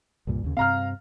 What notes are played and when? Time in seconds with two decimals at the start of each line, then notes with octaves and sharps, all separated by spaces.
0.27 C2 G2 A#2
0.44 D#2 C#3
0.57 G2 C3 C4 F5 A#5 F6